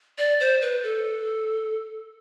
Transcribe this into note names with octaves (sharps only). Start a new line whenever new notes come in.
D5
C5
B4
A4